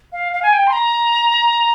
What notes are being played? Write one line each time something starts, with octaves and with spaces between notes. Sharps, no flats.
F5
F5
G#5
G5
C6
A#5